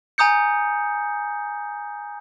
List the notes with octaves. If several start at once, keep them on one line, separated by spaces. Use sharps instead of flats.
G#5 A#5 D#6 G6 C#7